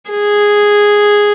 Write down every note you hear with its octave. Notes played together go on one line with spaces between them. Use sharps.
G#4